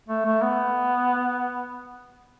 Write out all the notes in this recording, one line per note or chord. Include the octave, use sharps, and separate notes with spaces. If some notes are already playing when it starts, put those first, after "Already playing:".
A3
A3
B3